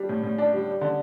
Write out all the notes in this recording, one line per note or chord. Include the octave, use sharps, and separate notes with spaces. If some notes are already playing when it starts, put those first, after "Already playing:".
Already playing: G3 D4
A2
A2
D4
G3
G3
D3